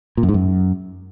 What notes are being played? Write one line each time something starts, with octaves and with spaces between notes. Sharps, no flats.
A#2
F#2
G#2
F#2